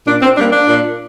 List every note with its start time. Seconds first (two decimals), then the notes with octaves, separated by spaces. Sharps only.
0.06 A#2 D4
0.22 C4
0.37 G3 A#3 D4
0.52 D4
0.68 A#2